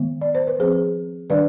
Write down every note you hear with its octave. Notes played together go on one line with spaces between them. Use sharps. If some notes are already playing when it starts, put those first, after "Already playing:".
Already playing: D#3 G#3 B3
D5
C5
B4
F3 C4 G#4 C5
D#3 G3 D4 B4 D5